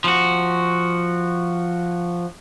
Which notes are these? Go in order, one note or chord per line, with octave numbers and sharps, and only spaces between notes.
F3 F#4